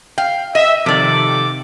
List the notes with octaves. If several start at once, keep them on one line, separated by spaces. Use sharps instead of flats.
F5 G5
D#5 E5 D#7
C3 D#3 F3 A4 D5 D6